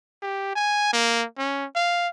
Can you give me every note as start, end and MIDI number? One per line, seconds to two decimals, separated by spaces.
0.22 0.52 67
0.55 0.91 80
0.93 1.25 58
1.38 1.65 61
1.75 2.08 77